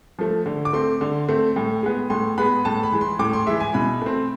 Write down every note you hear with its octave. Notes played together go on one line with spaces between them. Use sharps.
F3 A3
D3
D6
A3 C4 C6
D3
A3 C4
A2
G#3 B3
A2 C6
G#3 B3 B5
A2 A5
B5
E3 G#3
C6
A2 D6
C6
E3 G#3 E5
G#5
B2 B5
A3 C4